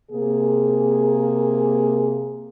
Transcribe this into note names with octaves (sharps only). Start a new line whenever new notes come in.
C3 A#3 G#4